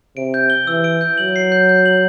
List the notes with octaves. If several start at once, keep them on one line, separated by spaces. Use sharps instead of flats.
C3 D7
G6
G7
E3 E6
D7
G6
F#3 F#7
C7
G6
G6
F#7